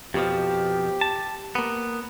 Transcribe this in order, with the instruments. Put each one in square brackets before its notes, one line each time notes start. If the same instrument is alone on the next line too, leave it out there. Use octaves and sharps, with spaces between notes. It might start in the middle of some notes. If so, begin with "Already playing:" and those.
[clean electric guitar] F2 B2 F3 [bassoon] G4
[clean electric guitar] A5
A#3 B3